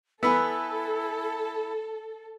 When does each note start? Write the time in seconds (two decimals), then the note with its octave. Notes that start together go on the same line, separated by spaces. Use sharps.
0.23 B3 E4 A4 B4 G#5 E6